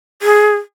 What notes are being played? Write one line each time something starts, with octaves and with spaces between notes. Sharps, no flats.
G#4